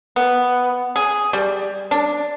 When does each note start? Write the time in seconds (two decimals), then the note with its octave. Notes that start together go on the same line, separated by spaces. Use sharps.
0.16 B3
0.96 G#4
1.33 G3
1.91 D4